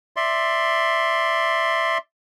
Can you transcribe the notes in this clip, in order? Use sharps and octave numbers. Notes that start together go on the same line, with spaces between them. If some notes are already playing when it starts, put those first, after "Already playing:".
D5 E5 C6